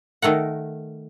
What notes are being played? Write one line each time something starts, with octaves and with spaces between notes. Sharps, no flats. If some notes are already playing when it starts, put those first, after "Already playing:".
D#3 A3 A#4 F#5